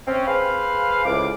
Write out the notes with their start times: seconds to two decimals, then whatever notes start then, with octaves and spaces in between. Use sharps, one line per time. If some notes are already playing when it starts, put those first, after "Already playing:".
0.07 C4 C#4
0.27 G#4 B4 C5 F5
1.05 C#2 A2 D6